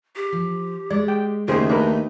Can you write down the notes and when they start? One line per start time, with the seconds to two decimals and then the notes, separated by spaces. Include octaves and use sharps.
0.16 G4
0.32 F3
0.90 G#3 D5
1.08 G5
1.48 D#2 C#3 A3 F4 G#4 C5
1.69 D4 D#4 A#4 B4